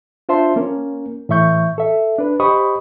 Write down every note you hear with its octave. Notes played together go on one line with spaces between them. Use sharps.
D4 F4 C5 E5 A5 C6
A#3 C#4 A#4
A2 E3 E5 C#6 G6
A4 E5
D4 B4
G4 C5 D#5 B5 C#6 D#6